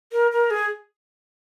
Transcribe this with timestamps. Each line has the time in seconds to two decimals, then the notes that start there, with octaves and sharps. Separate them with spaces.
0.12 A#4
0.31 A#4
0.50 G#4